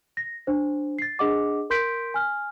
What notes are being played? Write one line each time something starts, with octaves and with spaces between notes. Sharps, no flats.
A#6
D4 C5
A6 C7
D4 G#4 D#5 F#5 D6
A#4 C6 G6 B6 D7
G#5 F6